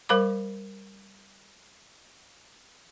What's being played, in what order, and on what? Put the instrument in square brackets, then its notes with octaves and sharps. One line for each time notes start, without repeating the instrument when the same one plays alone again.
[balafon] G3 A#4 C5 F5 B5 D6